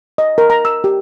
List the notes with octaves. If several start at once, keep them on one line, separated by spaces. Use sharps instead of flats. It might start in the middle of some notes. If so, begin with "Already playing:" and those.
D#5
A#4
A#5
E6
G4